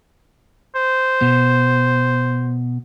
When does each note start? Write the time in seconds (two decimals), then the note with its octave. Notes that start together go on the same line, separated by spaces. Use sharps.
0.75 C5
1.21 B2